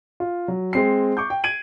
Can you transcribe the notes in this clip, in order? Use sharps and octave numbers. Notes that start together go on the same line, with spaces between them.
F4
F#3
G#3 C4 C7
C#6 D6 G6
G5
G#6 D7 D#7 F#7